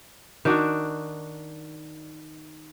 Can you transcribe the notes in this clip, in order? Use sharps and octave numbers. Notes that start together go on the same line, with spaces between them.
D#3 D4 F#4 D5